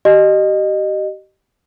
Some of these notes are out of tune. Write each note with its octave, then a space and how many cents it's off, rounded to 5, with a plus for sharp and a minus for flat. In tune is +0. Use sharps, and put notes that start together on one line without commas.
G4 -30 D#5 -20